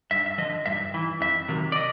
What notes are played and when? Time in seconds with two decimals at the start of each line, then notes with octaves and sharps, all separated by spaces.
0.11 G2 E5
0.26 E5
0.38 F3 D#5
0.42 D3
0.66 G2 E5
0.94 E3
1.21 F2 E5
1.48 C3 D#3 F#3
1.72 D5
1.76 D#5